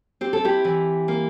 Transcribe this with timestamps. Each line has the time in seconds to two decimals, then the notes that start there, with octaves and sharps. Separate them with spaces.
0.21 C4 G4
0.33 A4
0.45 E4 G4
0.65 E3
1.08 A#3